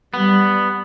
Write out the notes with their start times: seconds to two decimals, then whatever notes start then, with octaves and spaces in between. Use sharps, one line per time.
0.14 G3 B3